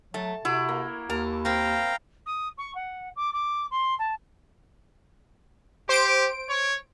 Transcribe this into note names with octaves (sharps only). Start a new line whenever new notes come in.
F#3 A3 A5
C3 E4 F#4
A#3
D#2 A#4 A5
A#3 C4 F5 G5 A#5
D#6
C#6
F#5
D6
D6
C6
A5
G4 C5 D7
C#5